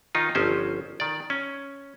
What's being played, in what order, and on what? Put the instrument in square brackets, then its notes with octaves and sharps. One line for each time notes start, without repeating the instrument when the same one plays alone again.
[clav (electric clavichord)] D#3 D#4 F4
G1 F3 C#4 C5
D#3 D5
C#4